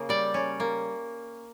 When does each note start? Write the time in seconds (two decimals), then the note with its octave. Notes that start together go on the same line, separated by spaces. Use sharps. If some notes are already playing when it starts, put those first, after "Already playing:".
Already playing: C#3 A#3
0.09 G3 D5
0.34 C#4
0.60 A#3